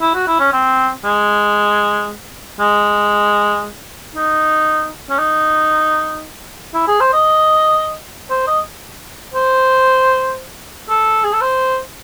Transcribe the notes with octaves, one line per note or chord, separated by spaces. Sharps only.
E4
F#4
E4
C#4
C4
G#3
G#3
D#4
C#4
D#4
E4
G#4
C5
D#5
C5
D#5
C5
A4
G#4
A4
C5